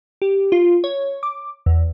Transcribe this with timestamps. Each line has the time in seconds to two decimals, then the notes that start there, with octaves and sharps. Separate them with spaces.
0.22 G4
0.52 F4
0.84 C#5
1.23 D6
1.66 E2